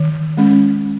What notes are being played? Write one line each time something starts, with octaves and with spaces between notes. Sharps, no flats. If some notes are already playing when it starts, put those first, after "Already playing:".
Already playing: D#3
G#3 C#4